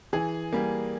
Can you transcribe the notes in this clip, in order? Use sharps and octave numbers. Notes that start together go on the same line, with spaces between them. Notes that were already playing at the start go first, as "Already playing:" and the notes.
E3 G#4
G3 A#3